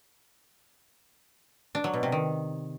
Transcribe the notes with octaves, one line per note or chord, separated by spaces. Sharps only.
D4
F#3
B2
C3
D#3